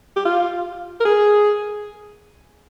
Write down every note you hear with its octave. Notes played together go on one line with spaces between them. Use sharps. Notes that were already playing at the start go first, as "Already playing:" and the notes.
G4
F4
A#4
G#4